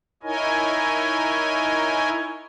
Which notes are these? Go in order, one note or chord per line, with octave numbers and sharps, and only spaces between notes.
D#4 E4 A#4 C#5 D#5 G#5